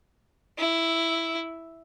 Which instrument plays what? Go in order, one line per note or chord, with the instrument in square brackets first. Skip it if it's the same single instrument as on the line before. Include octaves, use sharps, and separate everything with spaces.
[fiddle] E4